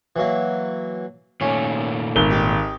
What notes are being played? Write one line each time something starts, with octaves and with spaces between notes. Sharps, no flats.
E3 F#3 A#3
A#2 D#3 A3 C#4
G#1 G7
D#4 G4 D6